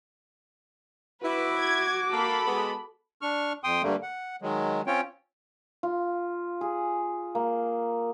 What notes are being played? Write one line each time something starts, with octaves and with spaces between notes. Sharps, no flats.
E4 F#4 B4 D6
G#6
A#3 A4 B5
G#3 B3
D4 C#6 F6
F2 G5 C6 D#6
G2 D3 G3 A3 A#3
F#5
D#3 F#3 G#3
C4 C#4 F4 C#5 G5
F4
G#4
A#3